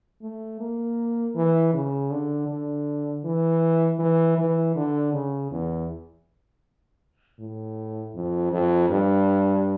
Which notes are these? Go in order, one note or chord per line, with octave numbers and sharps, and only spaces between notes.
A3
A#3
E3
C#3
D3
D3
E3
E3
E3
D3
C#3
E2
A2
F2
F2
G2